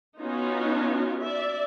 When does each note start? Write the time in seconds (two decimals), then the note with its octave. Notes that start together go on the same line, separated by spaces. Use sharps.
0.21 B3 C#4 D#4 F4 F#4
1.21 D5 E5